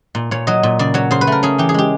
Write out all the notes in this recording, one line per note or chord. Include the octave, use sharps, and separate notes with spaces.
A#2
A#2 C#5
F#3 D#5
A#2
C#3 D5
F#3 C#5
C#3 C5
B4
A3 A#4
C#4 G#4
E3 G4
G#4
G#3 G4